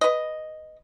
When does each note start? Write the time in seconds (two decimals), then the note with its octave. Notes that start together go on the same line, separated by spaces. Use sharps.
0.01 B4 D#5